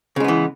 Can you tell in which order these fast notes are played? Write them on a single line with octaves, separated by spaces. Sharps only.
C#3 G#3 B3 E3